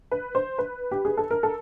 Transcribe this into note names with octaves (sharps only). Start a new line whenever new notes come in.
B4
C5
B4
G4
G#4
A4
A#4
A4